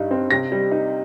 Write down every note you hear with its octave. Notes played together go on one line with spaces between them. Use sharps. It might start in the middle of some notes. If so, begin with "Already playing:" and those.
Already playing: G2 G3 D#4
C4
C3 A#6
G3
D#4